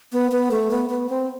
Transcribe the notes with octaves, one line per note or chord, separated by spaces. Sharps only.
B3
B3
A3
B3
B3
C4